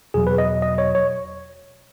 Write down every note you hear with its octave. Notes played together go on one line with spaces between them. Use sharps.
E2 B2 F#3 G#4
B4
D#5
D#5
C#5
C#5